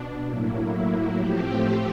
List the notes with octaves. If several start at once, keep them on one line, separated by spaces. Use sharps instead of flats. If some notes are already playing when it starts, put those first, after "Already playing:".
Already playing: B2 D4
A2 F#3 A#3 E4
E4
A2 F3 A3 C4 G4